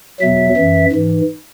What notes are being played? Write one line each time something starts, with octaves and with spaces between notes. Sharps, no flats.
E2 B2 F#3 E5
F#2 E3
G#2 E3